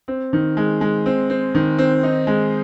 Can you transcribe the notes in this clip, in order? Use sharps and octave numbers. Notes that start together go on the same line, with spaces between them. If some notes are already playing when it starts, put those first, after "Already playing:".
C4
D#3
G#3
G#3
C4
C4
D#3
C4
D#4
G#3